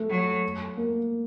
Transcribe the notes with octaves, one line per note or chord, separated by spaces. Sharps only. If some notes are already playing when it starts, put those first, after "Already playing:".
Already playing: A3
F#3
A#3